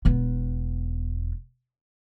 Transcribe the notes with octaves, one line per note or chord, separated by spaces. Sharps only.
E1 B3